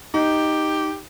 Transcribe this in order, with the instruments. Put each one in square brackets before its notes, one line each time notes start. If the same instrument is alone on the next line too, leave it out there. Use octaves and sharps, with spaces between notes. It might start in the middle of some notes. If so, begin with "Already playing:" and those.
[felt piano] D#4 [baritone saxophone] G4